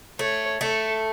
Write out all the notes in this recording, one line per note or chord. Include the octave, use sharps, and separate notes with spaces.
A3 C#5
A3 A4